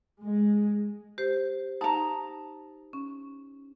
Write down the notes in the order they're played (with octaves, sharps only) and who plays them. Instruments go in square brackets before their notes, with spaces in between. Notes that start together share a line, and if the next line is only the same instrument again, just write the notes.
[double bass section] G#3
[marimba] G4 C5
[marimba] D#4 [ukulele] A5 A#5
[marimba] C#4